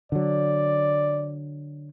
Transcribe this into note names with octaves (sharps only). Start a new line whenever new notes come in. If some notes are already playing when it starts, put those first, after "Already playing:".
D3 F#3 D5